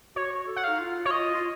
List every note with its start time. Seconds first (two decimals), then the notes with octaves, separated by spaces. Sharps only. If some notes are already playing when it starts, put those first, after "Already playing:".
0.16 F#4 C#5
0.47 A4
0.56 F#5
0.64 D#4 F5
0.79 F4
1.05 F#4 C#5
1.11 F4 D#5
1.34 F4